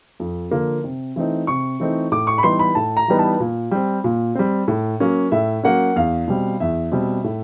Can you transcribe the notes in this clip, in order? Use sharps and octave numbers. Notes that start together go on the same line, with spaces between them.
F2
D3 F3 A#3
C3
E3 A3 C4 D#4
C3 C#6
E3 A3 C4 D#4
A2 D6
C#6
B5
E3 G3 B3 D#4 C6
B5
A2 A5
A#5
E3 G3 B3 D#4
A5
A#2
G3 C4
A#2
G3 C4
A2
F#3 A#3 C#4
A2 E5
F#3 A#3 C#4 F#5
E2 F5
B2 G3 C4
E2 E5
B2 G3 C4
A2